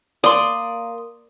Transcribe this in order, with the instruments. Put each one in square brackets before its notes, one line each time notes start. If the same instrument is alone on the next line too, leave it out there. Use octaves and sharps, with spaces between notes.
[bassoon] A#3 [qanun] D5 [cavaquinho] C6 D#6